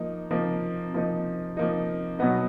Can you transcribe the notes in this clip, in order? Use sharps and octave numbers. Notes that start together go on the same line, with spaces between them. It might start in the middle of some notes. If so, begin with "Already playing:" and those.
Already playing: F3 A#3 D#4
F3 A#3 D#4
F3 A#3 D#4
F3 A#3 D#4
B2 F#3 B3 D#4